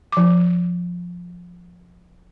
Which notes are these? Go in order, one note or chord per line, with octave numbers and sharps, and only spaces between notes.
F3 D6